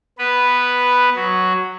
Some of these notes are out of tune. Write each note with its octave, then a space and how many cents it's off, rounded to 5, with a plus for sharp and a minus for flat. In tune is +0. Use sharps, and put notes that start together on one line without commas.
B3 +0 B4 +0
F#3 +0 F#4 +0